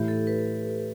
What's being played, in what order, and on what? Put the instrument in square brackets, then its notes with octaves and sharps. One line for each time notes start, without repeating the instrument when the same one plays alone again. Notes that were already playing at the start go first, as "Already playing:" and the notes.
Already playing: [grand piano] A2 E3 A3 E4 [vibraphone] G4
[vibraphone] A4
B4